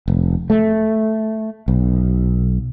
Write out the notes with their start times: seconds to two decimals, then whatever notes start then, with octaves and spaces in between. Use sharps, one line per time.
0.08 F1
0.50 A3
1.68 B1